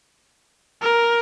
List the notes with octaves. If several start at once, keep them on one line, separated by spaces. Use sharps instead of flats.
A#4